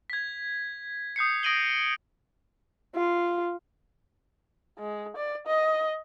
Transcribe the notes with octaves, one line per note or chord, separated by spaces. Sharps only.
G#6 B6
D#6 G6 C7 C#7
D#6 A#6 D7 D#7 F#7 G7
F4
G#3
D5
D#5